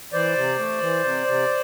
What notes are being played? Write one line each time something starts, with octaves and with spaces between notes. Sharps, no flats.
E3 C5 D5
C3
A3
E3
C3
C3